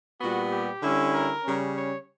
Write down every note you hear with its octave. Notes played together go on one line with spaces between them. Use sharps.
A#2 G3 B3 F#4
G4
D3 G3 C#4 E4
A#4
C#3 G3 C#4
C#5